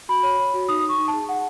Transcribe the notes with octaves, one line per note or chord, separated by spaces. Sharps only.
F#4 B5
C#5
C#5
F#4
D#4 D#6
D#4
C#6
D#4
A5
G#4
G#4 F#5